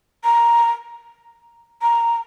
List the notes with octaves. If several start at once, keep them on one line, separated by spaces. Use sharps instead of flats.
A#5
A#5